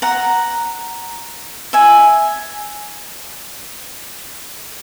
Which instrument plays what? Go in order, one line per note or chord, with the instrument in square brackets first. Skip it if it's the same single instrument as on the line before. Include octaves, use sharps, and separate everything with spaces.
[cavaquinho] F#5 A#5
E5 G#5